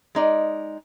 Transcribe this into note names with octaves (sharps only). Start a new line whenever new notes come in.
G#3 D#4 D5